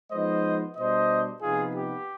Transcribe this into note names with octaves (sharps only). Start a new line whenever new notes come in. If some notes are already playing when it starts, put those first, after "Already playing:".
F3 G#3 B3 D#4 C5 D#5
B2 G3 D4 C5 D#5
C3 F3 B3 D#4 F4 G#4
G4